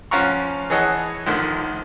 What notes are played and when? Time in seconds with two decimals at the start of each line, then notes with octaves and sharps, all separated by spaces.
0.11 F3 C#4 F4 F#5 A#5 C#6
0.70 E3 G#4 C#5 D#5 F#5 A5
1.26 A#1 D3 D#3 F3